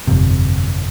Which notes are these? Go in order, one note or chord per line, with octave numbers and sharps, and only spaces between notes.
G1 F2 C3